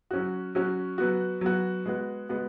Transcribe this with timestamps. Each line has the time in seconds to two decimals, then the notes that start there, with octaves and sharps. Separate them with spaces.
0.11 F#3 C#4 F#4
0.55 F#3 C#4 F#4
0.98 F#3 B3 F#4
1.41 F#3 B3 F#4
1.85 G#3 B3 F#4
2.29 G#3 B3 F#4